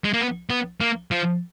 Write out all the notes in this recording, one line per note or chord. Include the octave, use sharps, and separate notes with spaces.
G#3
A#3
B3
B3
A#3
F3